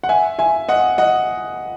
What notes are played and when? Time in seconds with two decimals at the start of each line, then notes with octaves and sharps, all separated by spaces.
0.03 F#5
0.09 E5 G#5
0.39 E5 G#5
0.69 D#5 F#5
0.98 D#5 F#5